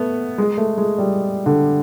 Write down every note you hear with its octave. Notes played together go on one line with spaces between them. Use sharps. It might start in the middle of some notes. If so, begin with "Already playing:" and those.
Already playing: A3 B3
G#3
A3
G#3
G3
D3